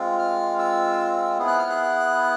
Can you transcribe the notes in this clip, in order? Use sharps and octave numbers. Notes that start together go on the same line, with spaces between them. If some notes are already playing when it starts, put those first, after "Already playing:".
Already playing: G#3 C4 F4
F6
E6
B3 E4 G#4
F#6
F6
F#6